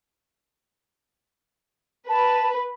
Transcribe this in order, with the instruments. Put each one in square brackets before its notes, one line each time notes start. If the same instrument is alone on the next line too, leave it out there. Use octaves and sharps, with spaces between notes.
[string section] B4 [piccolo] A5